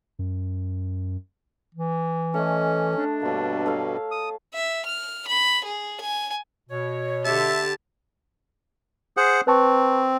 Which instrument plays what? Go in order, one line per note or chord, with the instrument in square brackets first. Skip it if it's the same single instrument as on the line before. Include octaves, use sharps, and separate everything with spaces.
[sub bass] F#2
[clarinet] E3
[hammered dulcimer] A3 D#5 [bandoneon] C#4
[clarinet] D4
[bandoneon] G2 B2 [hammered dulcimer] A#3 C#5
[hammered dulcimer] A4 C#5 F5
[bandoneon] D#6
[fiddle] E5
F6
B5
G#4
G#5
[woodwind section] B2 C#5
[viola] D3 G4 [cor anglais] E5 [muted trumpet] A5
[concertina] G#4 C5 F#5
[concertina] C4 [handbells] B4 A5 C#6